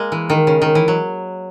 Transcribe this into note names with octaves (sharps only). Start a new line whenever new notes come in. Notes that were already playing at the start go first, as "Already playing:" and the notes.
Already playing: G#3 A#3
E3
D#3
C#3
D#3
E3
F#3